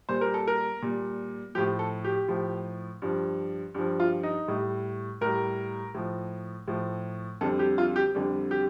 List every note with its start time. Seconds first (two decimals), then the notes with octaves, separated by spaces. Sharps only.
0.09 A#2 G3 C5
0.21 A#4
0.34 A4
0.47 A#4
0.82 A#2 G3
1.55 A2 F3 G4
1.79 A4
2.04 G4
2.28 A2 F3
3.02 G2 F3
3.75 G2 F3
4.00 F4
4.23 D#4
4.48 A2 G3
5.21 A2 G3 A#4
5.94 A2 F3
6.68 A2 F3
7.41 F2 D3 G3 A4
7.59 G4
7.78 F4
7.96 G4
8.15 F2 D3 G3
8.51 G4